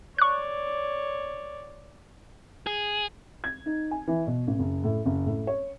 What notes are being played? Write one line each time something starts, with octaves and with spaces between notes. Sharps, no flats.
C#5 D5 C#6 F#6
G#4
G#6
D#4
G#5
E3
B2
A1
F#1
A2
F#1
A2
C#5